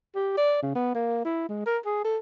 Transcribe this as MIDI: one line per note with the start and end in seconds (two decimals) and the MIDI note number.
0.15 0.36 67
0.37 0.58 74
0.63 0.75 49
0.75 0.95 59
0.95 1.24 58
1.25 1.45 64
1.49 1.63 56
1.66 1.78 70
1.86 2.03 68
2.05 2.18 69